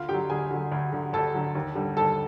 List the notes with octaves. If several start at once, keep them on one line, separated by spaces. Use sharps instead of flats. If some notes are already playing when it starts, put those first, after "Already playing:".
Already playing: D2 F4 F5
D3 F#3 G4 G5
D2 G#4 G#5
D3 F#3
D2
D3 F#3
D2 A4 A5
D3 F#3
D#2
D3 G3
D#2 A4 A5